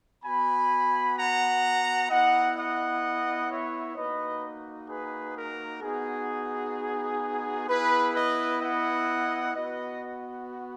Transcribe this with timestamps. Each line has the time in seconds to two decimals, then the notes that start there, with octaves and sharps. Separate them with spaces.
0.24 B3 F#4 G#5 B5
1.17 F#5 A#5
2.10 B3 E4 D#5 F#5
2.56 D#5 F#5
3.50 C#5 E5
3.96 A#3 D#4 F#4 B4 D#5
4.89 G#4 B4
5.36 A#4
5.82 B3 D#4 F#4 G#4
7.68 B3 E4 G#4 B4
8.14 B4 D#5
8.61 D#5 F#5
9.53 B3 F#4 B4 D#5